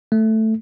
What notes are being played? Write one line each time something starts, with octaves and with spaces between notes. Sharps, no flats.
A3